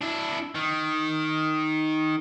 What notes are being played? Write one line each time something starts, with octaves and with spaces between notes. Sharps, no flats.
D4 E4
D#3